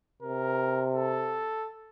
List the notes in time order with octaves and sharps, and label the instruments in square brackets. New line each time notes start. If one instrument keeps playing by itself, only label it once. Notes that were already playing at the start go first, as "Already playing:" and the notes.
[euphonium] C3 [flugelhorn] A#4
[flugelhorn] A4